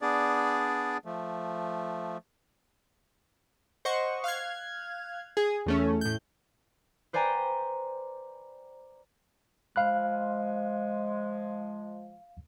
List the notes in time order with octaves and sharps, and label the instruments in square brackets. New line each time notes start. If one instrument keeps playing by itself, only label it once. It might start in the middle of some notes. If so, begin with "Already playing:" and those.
[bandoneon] B3 D4 G#4 D5
F3 A3
[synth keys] C5 D#5 F#5 C#6
F5 F6 F#6 G#6
G#4
E2 A3 C#4
A2 G6
[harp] B4 C5 D5 G5 G#5 A#5
[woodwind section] F3 G#3 [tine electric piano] F5 B5 F#6